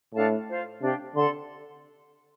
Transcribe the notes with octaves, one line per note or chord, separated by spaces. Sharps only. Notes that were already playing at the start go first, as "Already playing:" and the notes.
A2 D4 A4 F5 A5
F4 C5 F5
C3 D4 G4 F5
D3 A4 D5 A5 C6